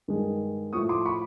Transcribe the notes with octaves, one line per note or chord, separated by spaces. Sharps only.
G2 D#3 G#3
A2 F3 A3 C#6 D#6
C6 D6
B5 C#6